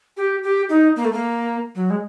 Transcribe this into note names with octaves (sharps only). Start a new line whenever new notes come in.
G4
G4
D#4
A#3
A3
A#3
F#3
G#3